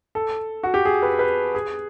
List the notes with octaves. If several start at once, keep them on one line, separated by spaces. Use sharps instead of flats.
A4
F#4
G4
G#4
B4
B4
G#4